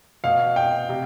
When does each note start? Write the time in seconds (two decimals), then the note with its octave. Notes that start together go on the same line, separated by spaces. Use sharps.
0.24 B2 F5
0.56 G5
0.89 C3